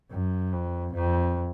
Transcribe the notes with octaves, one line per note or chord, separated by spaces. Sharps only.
F#2
F2
F2